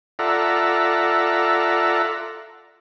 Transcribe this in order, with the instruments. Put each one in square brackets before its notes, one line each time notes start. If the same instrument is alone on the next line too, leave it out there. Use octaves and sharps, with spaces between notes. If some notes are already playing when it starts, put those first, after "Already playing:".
[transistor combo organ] F4 A4 D5 E5 F#5 A#5